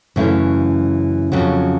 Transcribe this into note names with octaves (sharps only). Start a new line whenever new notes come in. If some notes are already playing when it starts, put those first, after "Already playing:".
F#2 C#3 E3 A3
F2 C#3 F#3